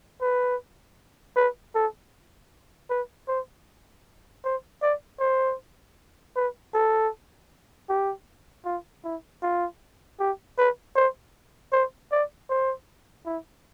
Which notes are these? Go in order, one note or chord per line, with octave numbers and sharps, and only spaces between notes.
B4
B4
A4
B4
C5
C5
D5
C5
B4
A4
G4
F4
E4
F4
G4
B4
C5
C5
D5
C5
E4